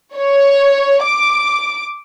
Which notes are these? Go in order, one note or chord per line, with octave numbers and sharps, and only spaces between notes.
C#5
D6